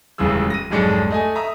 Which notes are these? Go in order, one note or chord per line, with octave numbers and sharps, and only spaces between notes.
D#1 C#2 C#3 E3 G#4 E6
A#6 D#7
F1 B1 G#2 G#3 D4 C#7
A3 D#5 G#5
E5 A#5 D#6